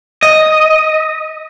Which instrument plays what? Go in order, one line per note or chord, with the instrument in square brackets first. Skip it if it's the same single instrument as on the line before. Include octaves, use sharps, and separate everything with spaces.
[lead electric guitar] D#5